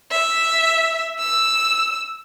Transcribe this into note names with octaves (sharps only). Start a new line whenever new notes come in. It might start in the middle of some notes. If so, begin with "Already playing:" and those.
E5
E6